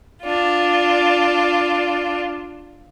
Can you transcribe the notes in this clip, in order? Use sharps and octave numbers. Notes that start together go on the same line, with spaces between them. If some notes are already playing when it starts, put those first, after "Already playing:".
D4 F4